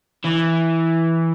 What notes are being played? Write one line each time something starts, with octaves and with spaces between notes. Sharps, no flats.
E3